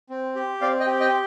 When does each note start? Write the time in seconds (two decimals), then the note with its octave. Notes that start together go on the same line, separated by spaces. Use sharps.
0.09 C4
0.36 G4
0.61 C4 D5 F5
0.80 D#5 G5
0.86 G4
1.00 D#5 G5